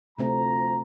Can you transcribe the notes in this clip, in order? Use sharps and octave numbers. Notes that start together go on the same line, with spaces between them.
D2 C3 F3 A3 C4 A#5